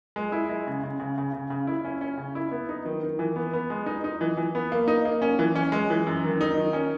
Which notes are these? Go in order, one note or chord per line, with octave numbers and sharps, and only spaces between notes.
G#3
E4
G#3
C#3
C#3
C#3
C#3
C#3
C#3
E4
C#4
C#4
C#3
E4
B3
D#4
D#3
D#3
E3
B3
B3
G#3
D#4
D#4
E3
E3
B3
A#3
D#4
A#3
C#4
E3
C#4
G#3
E3
F#2
D#3
D#4
D#3
C#4